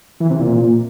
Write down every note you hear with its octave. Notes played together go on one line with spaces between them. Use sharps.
E3
C3
A#2